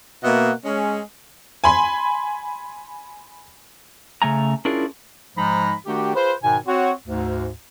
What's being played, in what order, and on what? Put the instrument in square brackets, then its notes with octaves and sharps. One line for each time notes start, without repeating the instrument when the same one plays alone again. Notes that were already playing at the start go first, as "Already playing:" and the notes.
[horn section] B2 A#3 D#5 E5 F#5
G#3 C#4
[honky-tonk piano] G#5 B5 C6
[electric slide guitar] C#3 A3 G#5 A#5
C#4 D4 E4 F4 G#4 A#4
[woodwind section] G#2 F3 G#3 D#4 A#5 B5
D#3 A3 D4 F#4 G4
F4 G#4 B4 C5
G#2 B2 D#3 G#5
C4 F#4 C#5
D2 G#2